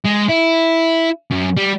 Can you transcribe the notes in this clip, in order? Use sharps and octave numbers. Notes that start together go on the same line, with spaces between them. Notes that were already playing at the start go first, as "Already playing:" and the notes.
G#3
E4
F#2
G3